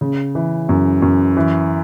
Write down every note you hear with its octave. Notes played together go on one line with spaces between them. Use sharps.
C#3
E3
F#2
F#2
E3